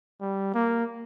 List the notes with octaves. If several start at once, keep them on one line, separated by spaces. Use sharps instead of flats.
G3
A#3